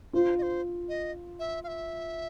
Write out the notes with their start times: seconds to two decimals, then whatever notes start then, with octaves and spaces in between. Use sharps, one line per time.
0.13 F4 C5
0.38 D#5
0.42 C5
0.89 D#5
1.39 E5
1.64 F5
1.68 E5